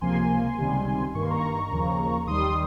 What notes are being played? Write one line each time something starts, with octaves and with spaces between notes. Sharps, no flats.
C#2 C3 F3 A#3 G#5 C6
C#2 C3 D#3 G3
G2 D#3 A#3 C#6
C6
A#5 C#6
D#2 C#3 F3 A#3
D#2 D#3 G3 C6 D#6
D#6